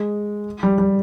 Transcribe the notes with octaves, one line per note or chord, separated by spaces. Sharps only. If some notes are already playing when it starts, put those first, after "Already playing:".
Already playing: G#3
G3
G3